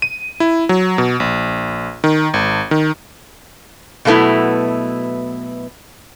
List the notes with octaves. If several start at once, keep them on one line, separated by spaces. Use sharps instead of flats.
D#7
E4
F#3
B2
A#1
D#3
G#1
D#3
B2 F#3 A3 B3 E4